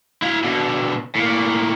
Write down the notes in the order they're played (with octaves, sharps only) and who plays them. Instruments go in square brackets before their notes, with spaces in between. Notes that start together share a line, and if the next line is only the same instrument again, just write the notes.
[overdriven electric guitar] E4 F5
B2 D3
A2 A#3